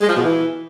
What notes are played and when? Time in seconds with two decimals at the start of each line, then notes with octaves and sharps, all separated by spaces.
0.01 G#3
0.09 F3
0.17 B2
0.25 E3